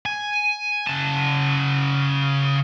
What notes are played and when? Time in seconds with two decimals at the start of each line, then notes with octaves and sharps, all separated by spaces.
0.06 G#5
0.87 C#3 A5